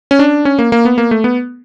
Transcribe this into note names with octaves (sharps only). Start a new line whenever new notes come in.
C#4
D4
C#4
A#3
A#3
B3
A#3
A3
B3